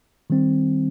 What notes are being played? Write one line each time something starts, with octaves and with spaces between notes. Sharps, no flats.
D#3 G3 C4